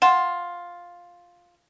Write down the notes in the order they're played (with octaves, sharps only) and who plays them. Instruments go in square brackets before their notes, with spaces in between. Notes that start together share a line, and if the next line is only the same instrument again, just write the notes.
[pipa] F4 [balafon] F#5